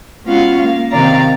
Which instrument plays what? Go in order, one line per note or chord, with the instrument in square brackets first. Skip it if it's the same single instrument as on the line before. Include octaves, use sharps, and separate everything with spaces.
[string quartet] G#3 B3 C#4 F4 F#4 F5
A#3 F5
C3 D#3 D5 F5 A#5